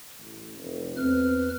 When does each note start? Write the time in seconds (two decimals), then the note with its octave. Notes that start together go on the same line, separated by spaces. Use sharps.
0.19 A1
0.57 F1
0.97 E2 C4 B4 F6